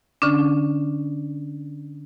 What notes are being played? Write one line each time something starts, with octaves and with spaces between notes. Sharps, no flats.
D3 C#4 D4